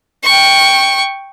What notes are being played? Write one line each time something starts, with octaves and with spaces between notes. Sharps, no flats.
G5 C#6